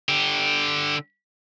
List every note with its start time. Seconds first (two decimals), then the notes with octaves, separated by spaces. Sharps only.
0.09 D3 G4